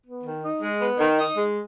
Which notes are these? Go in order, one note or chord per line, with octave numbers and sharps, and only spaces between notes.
B3
D#3
D#4
G#3
B3
D#3
D#4
G#3